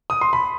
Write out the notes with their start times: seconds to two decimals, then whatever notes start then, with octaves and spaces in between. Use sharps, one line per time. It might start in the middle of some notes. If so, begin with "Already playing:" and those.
0.10 D#6
0.21 C6
0.33 B5